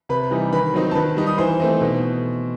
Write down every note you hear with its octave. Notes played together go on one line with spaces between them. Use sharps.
C3 B4 B5
E3 G3 D#4
D#3 B4 B5
F#3 C4 D#4
A5
D#3 B4 B5
G3 D#4
D#6
E3 C5 C6
A3 C4 D#4
B2